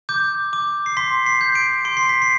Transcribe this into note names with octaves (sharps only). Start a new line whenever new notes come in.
D6 G6
D6
C7
C6 B6
C7
G6
D7
C6 D7
C7
B6
C7